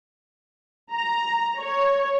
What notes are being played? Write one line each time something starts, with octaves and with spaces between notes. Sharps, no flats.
A#5
C#5